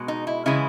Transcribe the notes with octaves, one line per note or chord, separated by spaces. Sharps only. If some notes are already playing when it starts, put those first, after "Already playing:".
Already playing: B2 G#3
D#4
E4
C#3 E3 G#3 E4